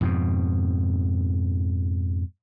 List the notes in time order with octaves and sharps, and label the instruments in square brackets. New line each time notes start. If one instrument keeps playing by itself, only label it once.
[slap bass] F2 G#2 B2